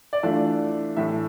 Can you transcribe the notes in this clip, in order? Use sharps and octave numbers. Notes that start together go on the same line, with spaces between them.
D5
E3 A3 D4 F4 E5
A2 E3 A3 E5